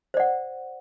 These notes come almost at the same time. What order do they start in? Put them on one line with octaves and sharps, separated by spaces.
C5 D5 F#5